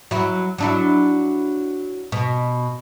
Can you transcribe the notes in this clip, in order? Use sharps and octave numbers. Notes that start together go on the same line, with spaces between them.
F#3 E4
F#3 D4 E4
B2